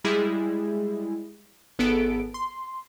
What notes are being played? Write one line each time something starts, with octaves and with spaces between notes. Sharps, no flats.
G3 G#3 E4 G#4
G#1 B3 G#4 A4 D7
C6